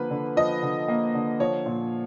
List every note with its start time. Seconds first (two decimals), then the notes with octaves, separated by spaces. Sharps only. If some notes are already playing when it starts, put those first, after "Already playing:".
Already playing: D3 F3 A#3 B4
0.11 D3
0.36 F3 D#5
0.63 D3
0.88 A#3
1.14 D3
1.40 F3 C#5
1.66 A#2